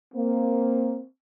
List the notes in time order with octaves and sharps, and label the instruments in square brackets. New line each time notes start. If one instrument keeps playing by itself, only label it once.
[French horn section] A#3 [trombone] C4